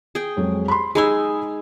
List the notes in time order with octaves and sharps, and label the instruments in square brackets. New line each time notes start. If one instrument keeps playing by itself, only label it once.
[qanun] G#4 G5
[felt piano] F2 F#3 G#3
B5 C6
[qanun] G#3 D#4 G#5 [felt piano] G#4 B5 E6